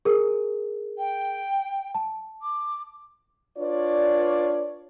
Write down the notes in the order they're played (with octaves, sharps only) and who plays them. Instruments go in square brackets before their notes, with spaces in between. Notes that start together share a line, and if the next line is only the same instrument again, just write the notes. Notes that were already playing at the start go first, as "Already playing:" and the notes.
[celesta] G#4 A#4
[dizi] G5
[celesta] A5
[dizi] D6
[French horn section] D4 F4 B4 C#5 D5